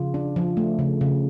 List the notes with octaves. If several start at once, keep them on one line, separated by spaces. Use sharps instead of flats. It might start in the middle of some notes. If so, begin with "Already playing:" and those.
Already playing: C#3 F3 F4
D4
F3
A3
C#3
C#3